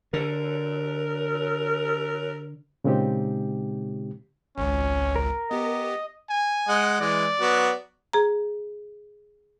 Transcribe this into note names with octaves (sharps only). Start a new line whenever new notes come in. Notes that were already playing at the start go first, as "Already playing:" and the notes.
D3 A#4
A#2 C#3 G#3 C4 D#4 G4
G#1 C#2 C#4
A#4
B3 G4 D#5
G#5
G#3 D#5 F#5
E3 G#3 D5
F#3 B3 F#4
G#4 A#5